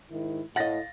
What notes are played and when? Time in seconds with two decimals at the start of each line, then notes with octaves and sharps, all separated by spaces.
0.11 G#2 D#3 E4
0.56 A2 D#5 F5 F#5 A6 A#6